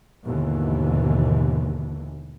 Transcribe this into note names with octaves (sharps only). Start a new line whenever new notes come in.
D#2 G#2 B2 D3 E3